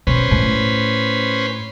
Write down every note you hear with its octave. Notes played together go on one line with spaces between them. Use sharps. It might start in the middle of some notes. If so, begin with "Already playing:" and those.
B2 C#4 B4 C5
A2